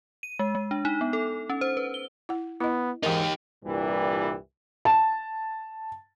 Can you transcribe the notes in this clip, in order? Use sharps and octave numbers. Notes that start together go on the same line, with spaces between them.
D#7
G#3
G#3
D4
D#4
B3
A4
C#4
C5
B4
G7
E4 F#5
B3 E4 D#5
G#2 E3 D#4 G4 A#4
C2 G2 A#2 E3 G3
A5